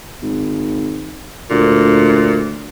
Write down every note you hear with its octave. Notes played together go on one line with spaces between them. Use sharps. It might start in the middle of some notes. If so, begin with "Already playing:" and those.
G#1
D2 A#2